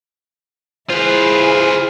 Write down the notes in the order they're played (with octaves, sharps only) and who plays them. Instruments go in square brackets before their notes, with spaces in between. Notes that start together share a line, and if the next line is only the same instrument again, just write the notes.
[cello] E4 G#4 [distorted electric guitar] F4 B4 [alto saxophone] C5